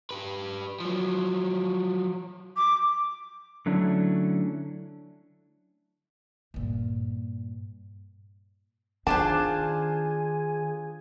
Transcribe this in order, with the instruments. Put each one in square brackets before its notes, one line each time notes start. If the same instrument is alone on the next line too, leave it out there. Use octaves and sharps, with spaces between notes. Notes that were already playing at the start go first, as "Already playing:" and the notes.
[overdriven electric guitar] G4 B4
F3 F#3
[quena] D6
[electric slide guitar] D3 F#3 A3 C#4 D4 E4
[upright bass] G2 A#2
[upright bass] D#3 [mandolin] D4 F4 C5 [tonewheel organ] G#4 [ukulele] A5